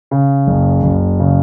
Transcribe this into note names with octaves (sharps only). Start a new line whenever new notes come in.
C#3
F#1
F#1
C#3